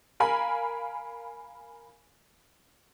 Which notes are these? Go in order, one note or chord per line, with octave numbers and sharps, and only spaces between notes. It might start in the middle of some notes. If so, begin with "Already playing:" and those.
A#4 F5 G#5 B5